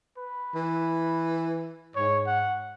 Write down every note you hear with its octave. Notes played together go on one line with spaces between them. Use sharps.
B4
E3
G#2 C#5
F#5